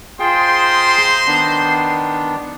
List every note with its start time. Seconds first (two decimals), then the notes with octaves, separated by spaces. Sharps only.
0.20 D#4 F4 G#4 C5 G5 C6
1.26 D#3 B3 D4